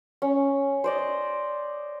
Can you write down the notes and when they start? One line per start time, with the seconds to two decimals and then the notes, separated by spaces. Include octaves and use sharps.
0.22 C#4
0.84 C5 D5 D#5